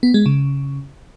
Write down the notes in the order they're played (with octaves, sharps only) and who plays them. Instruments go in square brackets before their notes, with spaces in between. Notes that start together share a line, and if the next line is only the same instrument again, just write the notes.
[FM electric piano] B3
G#3
C#3